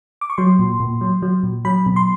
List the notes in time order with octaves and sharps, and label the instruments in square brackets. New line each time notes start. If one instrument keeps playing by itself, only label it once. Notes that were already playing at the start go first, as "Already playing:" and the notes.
[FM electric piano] D6
C#6
F#3 C6
A#2
A#2
F#3
F#3
A#2
F#3 B5
B2
C6